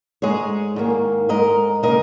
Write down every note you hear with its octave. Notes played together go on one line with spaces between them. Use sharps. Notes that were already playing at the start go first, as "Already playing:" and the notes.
G#2 G#3 G#4 C#5
G#2 D#3 A#3
G#2 G#3 A#4 D#5
C#3 A#3 A#4 D#5